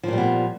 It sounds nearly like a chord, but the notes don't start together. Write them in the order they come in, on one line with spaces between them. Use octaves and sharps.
F3 A#2 G3 B3